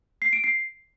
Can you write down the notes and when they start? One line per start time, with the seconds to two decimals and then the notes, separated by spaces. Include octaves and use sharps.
0.22 C7
0.33 D7
0.44 C7